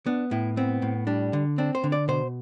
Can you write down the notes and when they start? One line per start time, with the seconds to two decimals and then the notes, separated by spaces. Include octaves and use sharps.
0.06 B3 D4
0.31 A2 E4
0.57 B3 C4
0.82 A2
1.07 G3 D4
1.33 D3
1.58 C4 D4
1.75 C5
1.84 D3
1.92 D5
2.08 B2 C5